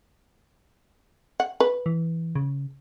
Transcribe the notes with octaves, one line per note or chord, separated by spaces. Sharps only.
F#5
B4
E3
C#3